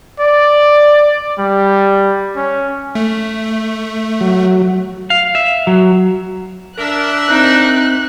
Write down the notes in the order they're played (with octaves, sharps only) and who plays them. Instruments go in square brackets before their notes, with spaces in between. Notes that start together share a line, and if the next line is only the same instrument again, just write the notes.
[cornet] D5
G3
C#4
[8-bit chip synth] A3
[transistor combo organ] F#3
[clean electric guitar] F5
E5
F#3
[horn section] D4 A#4 E5 [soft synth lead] F6 [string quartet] F#6
[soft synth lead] C4 [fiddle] D#4